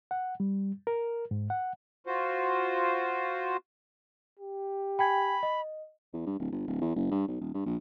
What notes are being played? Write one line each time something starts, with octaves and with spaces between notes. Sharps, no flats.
F#5
G3
A#4
G#2
F#5
F4 F#4 C5
G4
G5 G#5 B5 G#6
D#5
E2
G2
D1
G1
D1
E2
F#1
G2
B1
D#1
G2
A#1